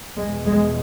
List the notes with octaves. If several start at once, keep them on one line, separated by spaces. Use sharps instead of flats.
E2 B2 G#3
G#3